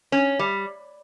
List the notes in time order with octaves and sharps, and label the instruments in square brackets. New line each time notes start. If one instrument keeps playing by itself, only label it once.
[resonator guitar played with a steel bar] C#4
G3